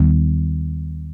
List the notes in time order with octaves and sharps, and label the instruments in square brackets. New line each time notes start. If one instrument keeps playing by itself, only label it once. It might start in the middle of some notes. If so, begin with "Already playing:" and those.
Already playing: [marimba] D#2 D#3 G3 B3